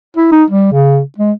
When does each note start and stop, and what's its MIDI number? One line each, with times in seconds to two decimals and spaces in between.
0.17 0.29 64
0.32 0.44 63
0.50 0.71 55
0.72 1.01 49
1.18 1.32 56